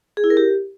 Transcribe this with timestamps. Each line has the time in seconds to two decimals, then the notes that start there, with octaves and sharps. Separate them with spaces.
0.17 G#4
0.24 E4
0.30 A#4
0.37 G4